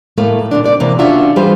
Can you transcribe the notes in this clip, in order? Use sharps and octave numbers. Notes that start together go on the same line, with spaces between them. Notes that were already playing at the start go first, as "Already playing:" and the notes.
A2 A3 A#3
A#2 D3 D4
C4 D5
C3 E3 A#3
C#4 D4 F4 F#4 E5 F#5
E3 G3 F4 G#4 B4 C5